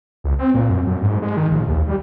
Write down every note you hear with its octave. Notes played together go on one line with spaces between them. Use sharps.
C#2
C4
A#2
F#2
F#2
G#2
G#3
D#3
A#1
D#2
G3